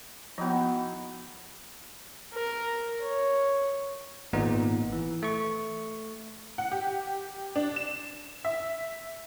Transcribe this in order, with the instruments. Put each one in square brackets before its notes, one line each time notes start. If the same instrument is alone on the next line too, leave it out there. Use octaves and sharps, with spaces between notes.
[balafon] F3 B3 [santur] D#4 E4 F#4
[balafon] B3
[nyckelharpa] A#4
C#5
[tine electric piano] G#1 A#2 B3 D#4
E3
A3 C#6
[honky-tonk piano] F#5
G4
D4
E7
E5